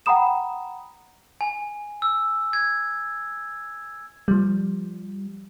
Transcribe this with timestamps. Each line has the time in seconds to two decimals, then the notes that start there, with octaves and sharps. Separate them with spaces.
0.06 F#5 G5 A#5 B5 D#6 E7
1.41 G#5
2.02 E6
2.53 G#6
4.28 F3 G3